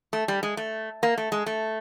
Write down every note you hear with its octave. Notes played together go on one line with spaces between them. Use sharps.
A3
G3
G#3
A3
A#3
A3
G#3
A3